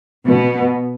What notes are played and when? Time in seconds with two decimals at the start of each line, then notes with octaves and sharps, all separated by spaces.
0.25 B2 B3